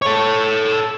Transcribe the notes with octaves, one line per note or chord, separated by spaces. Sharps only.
A4 C#5